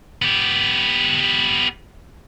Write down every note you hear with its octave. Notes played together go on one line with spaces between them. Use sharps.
B3 G4